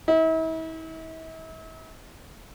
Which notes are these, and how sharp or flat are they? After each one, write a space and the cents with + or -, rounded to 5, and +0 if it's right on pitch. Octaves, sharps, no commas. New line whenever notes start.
E4 -40